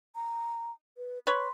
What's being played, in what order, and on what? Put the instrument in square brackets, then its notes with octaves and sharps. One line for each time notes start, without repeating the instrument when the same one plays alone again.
[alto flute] A#5
B4
[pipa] B4 C#5 [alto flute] C6